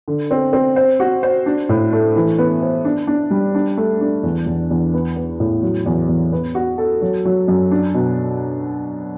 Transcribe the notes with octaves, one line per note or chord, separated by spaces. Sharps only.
D3
C4
C4
C5
F#4
C5
D4
A2
A3
E3
B3
C5
D4
D4
G3
D4
A3
D4
E2
E2
E2
B3
B3
A2
F#3
E2
E2
B3
F#4
A4
F#3
F#3
F#2
D4
B2